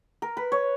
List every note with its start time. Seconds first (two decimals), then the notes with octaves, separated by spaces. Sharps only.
0.22 A#4
0.37 B4
0.52 C#5